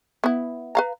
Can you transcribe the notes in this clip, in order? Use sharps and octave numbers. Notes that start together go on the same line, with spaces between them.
B3 E4
B4 F5 A#5